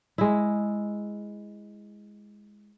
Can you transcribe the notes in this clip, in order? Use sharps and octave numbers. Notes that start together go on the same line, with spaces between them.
G#3 E4